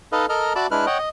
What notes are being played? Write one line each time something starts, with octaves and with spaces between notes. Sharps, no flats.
D#4 A4 B4 D#5 F5
A4 A#4 D#5 A#5 F6
F#4 D5 E5 A5 B5 D6
G#3 D4 E4 B4 F6 F#6
C#5 D#5 F#5 G5
D#5